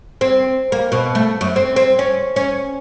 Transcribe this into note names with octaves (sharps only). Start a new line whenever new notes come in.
C4
A#3
B2
A3
F#2
C4
C4
C#4
C#4